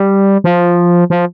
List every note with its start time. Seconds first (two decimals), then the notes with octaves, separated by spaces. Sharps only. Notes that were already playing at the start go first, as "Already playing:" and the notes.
Already playing: G3
0.44 F3
1.10 F3